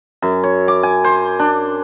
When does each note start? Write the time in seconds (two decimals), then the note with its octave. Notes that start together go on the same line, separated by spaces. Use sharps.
0.22 F#2
0.44 C#5
0.68 D6
0.83 G#5
1.04 C5
1.39 D4